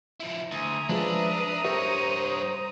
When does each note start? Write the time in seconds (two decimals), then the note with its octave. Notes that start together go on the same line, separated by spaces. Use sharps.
0.20 F3 E4
0.51 D2 E5 G#5 A#5 D#6
0.89 F3 G#3 D4 G#4 B4 E5
1.65 G2 G4 A#4 C5 C#5 E5